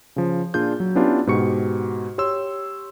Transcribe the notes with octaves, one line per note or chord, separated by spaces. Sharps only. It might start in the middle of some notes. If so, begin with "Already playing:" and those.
C#3 F3
A#2 D4 F4 G#4 G6
F#3
B3 C#4 D4 E4 F4 G4
G#2 B2 F#4 G4 C#6 C#7
G4 C#5 C6 E6